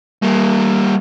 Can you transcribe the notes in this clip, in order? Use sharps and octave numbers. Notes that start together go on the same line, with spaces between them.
G3 A#3